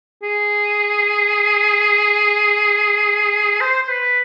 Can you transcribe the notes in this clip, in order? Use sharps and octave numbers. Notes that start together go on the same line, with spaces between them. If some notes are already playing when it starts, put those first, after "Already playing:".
G#4
C5
C5
B4